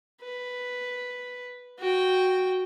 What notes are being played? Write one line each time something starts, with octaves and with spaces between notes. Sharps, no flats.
B4
F#4 G5